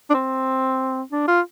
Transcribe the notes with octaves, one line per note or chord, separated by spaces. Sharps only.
D4
C4
D4
F4